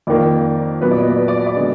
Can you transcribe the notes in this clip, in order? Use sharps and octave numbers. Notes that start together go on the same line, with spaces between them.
F2 D#3 A#3 D5
A#2 F#3 B3 B4
D5
D#5
D5
B4
D5
D5
D3 G#3 B3 D#5